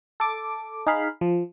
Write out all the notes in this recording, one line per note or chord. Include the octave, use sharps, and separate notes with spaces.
A4 D6
D#4 G#4 F5 B5
F3